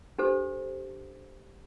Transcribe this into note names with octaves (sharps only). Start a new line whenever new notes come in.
D4 G4 A4 C5